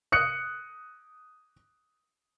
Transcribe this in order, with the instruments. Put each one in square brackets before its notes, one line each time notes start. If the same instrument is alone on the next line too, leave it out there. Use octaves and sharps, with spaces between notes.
[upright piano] D#6 F#6 C#7